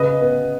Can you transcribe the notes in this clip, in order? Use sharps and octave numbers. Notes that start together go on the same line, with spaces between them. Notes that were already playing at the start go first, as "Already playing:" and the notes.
Already playing: C#3 B4 D#5
B3